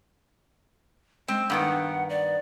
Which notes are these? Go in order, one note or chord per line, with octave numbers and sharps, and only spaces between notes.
G#3 C4
G2 D#3 B3 F#5
D5